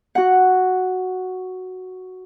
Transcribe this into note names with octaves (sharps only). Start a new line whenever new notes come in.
F#4 F#5